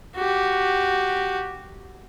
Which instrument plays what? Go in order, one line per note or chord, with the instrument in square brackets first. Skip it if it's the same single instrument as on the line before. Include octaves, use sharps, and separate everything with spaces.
[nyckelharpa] F#4 G4